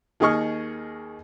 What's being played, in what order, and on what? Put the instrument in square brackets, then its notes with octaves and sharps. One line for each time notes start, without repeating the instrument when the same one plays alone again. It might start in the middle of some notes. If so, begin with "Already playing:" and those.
[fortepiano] D#2 D#3 G#4 D#5 C#6 F6